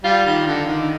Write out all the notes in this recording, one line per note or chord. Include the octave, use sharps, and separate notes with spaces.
G3 F4
D#3
D3
D#3